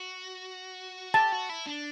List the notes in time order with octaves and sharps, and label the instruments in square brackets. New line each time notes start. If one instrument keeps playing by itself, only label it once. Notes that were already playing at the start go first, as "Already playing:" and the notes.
Already playing: [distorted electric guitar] F#4
[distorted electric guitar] G4 [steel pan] A5
[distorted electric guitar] F#4
E4
D4